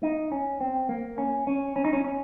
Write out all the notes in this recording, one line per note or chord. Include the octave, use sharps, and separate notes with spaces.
D#4
C#4
C4
A#3
C#4
C#4
C#4
D#4
C#4
C#4